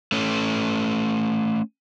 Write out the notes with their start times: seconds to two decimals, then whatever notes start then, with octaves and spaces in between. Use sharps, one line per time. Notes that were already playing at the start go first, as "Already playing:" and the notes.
0.12 A3 C#4